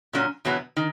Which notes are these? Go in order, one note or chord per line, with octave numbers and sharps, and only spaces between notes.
A#2 F#3 C#4
E2 B2 F#3 B3
D#3